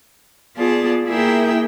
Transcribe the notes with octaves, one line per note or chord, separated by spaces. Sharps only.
B3 F4 G#4 D5 A5
A#3 E4 G#4 A#4 E5 G5